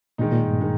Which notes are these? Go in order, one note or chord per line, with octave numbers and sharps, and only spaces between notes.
A#2 D#3 G#3 D#4
A#2
G2
D#3 G#3 D#4